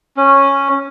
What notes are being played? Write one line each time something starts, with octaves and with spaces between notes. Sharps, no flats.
C#4